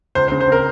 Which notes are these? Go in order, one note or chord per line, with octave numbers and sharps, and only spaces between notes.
C#2 C5
C5
C#3
C5
C4 A#4